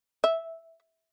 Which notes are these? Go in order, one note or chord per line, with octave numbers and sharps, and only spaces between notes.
E5